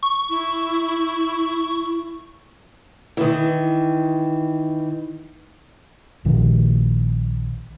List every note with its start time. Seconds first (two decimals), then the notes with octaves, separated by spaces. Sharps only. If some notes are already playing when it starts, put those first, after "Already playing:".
0.03 C#6
0.30 E4
3.17 D#3 E3
6.25 A#1 A#2 D#3 F3